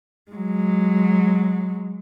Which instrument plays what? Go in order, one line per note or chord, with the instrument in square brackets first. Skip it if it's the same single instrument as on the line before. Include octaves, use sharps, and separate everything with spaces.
[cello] F#3 G#3